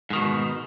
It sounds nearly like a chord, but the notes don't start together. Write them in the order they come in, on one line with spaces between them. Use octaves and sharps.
G#2 D#3 B2